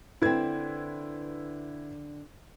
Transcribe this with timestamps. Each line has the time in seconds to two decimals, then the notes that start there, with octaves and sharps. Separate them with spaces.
0.22 D3 C4 E4 B4 G#6